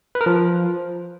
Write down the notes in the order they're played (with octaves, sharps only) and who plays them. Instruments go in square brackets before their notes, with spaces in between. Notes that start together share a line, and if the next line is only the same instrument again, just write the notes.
[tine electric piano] B4
A#4
F3